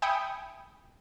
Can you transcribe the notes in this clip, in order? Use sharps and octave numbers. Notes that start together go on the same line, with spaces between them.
E5 G5 G#5 B5 D#6 C#7